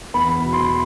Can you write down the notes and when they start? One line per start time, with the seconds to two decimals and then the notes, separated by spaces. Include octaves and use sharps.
0.14 E2 B5
0.44 B2
0.53 C6
0.63 B5